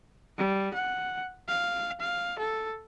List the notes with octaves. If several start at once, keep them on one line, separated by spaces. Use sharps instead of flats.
G3
F#5
F5
F5
A4